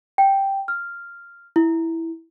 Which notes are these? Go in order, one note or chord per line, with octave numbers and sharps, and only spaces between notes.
G5
F6
E4